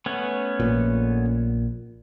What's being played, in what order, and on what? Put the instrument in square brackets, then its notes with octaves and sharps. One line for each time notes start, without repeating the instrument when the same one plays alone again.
[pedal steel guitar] A3 B3 C#4
[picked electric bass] A#1 A#2